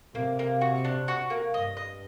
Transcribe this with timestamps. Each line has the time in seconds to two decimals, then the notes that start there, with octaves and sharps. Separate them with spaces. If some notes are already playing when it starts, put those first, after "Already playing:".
0.15 C3 A#3
0.39 A#3
0.61 F#4
0.85 D4
1.08 F#4
1.30 A#3
1.54 G2 D#5
1.77 D#5